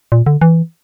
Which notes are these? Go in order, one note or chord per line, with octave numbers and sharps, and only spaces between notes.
A#2
D3
E3